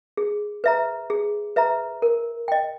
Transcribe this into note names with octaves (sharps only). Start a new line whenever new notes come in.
G#4
B4 E5 A#5
G#4
B4 E5 A#5
A#4
D#5 G5